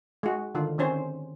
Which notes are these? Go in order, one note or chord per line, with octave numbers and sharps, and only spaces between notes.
G#3 F#4
D3 D#3 F4
D#3 C4 C#4 C5